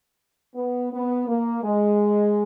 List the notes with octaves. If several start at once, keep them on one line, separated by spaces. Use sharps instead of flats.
B3
B3
A#3
G#3